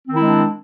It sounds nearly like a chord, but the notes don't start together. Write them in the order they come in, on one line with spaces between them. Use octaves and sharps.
C4 D#3 E4 G#3 D4